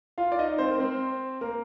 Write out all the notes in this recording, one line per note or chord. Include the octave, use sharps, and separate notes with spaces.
F4 F5
D5
D#4 D#5
C4 C5
A#4
C4 C5
A#3 A#4